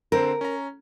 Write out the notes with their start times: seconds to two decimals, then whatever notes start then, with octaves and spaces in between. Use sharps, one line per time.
0.12 D3 C4 A#4 C5
0.41 C#4 A#5